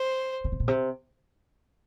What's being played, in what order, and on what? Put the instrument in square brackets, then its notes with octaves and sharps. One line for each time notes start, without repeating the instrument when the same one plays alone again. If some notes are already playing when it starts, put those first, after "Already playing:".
Already playing: [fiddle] C5
[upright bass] C#3
C3
A#2
C3